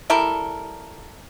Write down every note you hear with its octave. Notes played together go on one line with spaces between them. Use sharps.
G3 E4 A4 A#4